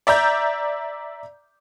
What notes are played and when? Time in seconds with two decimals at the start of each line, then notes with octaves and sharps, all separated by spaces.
0.07 D5 E5 A#5 G6